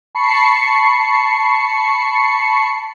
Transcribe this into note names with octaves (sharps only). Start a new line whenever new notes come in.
A5 B5 C#6 C7 C#7